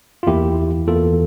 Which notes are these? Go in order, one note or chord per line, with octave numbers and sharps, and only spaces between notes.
F4
E2 E3 A#3 E4 G4
E2 E3 A#3 F4 A4